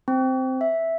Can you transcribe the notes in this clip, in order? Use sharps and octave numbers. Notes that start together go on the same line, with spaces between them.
C4
E5